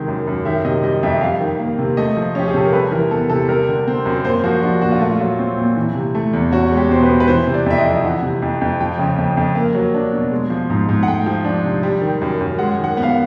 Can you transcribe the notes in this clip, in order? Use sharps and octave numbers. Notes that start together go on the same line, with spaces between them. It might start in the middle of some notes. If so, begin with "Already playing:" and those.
Already playing: C3 D#3 G#3
F#2
F#2
D#3 E5
C3 D#5
G3 D#5
F2 E5
G3 F5
D#3
A#3
C3
A3 D#5
F3
C#4 G4
G#4
C3 A4
A#4
G3 B4
E3 A#4
B3 A4
C3 A4
G3 A#4
D3
C4
F#2
A#3 C5
F3 F#4
D4 F#4
A#2 F#4
F4
A3
F4
F#3
C4
A#2
E3
C3
A3
E2
C#4 F#4
G#3
G4
B2 C5
B4
B2
B4
E3 C5
C3
D5
F2 E5
D#5
F2
E3 F#5
C3
F2
F2
F3 G5
C#3
F2
F2
A#3
F#3
D4
B2
G#3
F3
G#2
G#2
F#5
A3 G5
F3
D4
C3
G3
D#3
F#2
F#2
G#3 F#5
D#3
F#5
B3
F5
F#5